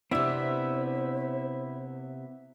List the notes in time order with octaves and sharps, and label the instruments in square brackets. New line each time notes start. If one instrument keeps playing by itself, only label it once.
[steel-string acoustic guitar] C3 B3 [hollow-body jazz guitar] C4 D4 E4 [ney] C5 [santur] E5